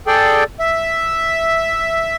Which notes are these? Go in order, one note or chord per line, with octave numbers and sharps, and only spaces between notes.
G#4 A4 D5 G5
E5